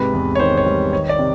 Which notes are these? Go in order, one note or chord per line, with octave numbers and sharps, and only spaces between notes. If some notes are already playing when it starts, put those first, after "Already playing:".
Already playing: G#2 C3 G#3 B4
E2
C#5
D#3 C5
C#5
G3
D#3 C#5
D5
C3